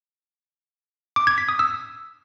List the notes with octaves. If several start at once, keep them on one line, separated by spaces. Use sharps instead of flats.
D6
G#6
B6
D#6
E6